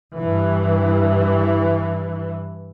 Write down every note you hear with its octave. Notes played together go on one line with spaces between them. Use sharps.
G2 E3